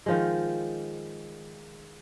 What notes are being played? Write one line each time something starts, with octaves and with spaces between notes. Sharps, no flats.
D#3 F3 G#3